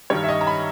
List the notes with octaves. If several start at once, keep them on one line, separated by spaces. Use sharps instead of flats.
G2 D#3 G3 C#5
E5
D#5
A#5
B5